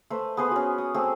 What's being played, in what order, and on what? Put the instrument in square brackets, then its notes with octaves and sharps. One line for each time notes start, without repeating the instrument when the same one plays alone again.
[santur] A3 B4 C5
B3 G#4 B4 C5
C#4 F#4
D#6
A3 C4 G#4